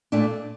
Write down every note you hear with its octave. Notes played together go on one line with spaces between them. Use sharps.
A#2 A3 D4